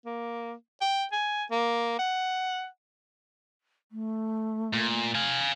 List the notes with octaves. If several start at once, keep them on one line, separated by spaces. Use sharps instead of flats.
A#3
G5
G#5
A#3
F#5
A3
A#2
F5 G#5